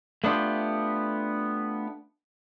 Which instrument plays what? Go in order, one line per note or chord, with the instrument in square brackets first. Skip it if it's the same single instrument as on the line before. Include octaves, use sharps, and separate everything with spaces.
[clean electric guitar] A3 B3 D4 F4 G4